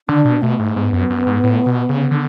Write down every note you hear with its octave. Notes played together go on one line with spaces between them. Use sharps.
D3 D4
B2
B2 A3
G#2
G#2 B3
F#2
F#2
G#2
A2
B2
C#3
D3